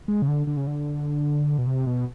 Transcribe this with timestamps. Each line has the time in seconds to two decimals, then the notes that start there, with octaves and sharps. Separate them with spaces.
0.08 G#3
0.22 C#3
0.28 D3
0.47 D3
0.57 C#3
0.67 D3
1.58 B2
1.67 C3
1.87 B2